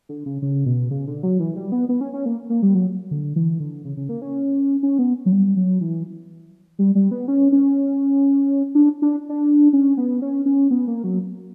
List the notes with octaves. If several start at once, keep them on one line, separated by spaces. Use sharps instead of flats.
D3
C#3
C#3
B2
C#3
D3
F#3
E3
G3
B3
B3
C#4
C#4
A#3
A#3
G3
F#3
D3
E3
D3
C#3
C#3
A#3
C#4
C#4
B3
F#3
G3
F#3
E3
G3
G3
B3
C#4
C#4
D4
D4
D4
C#4
B3
C#4
C#4
B3
A#3
F#3